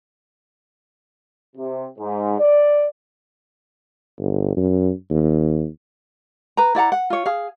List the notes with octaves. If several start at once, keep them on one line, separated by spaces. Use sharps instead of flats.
C3
G#2
D5
G1
F#2
D#2
B4 A#5
E4 D5 F#5 A#5
F#5
F4 C#5
G#4 F5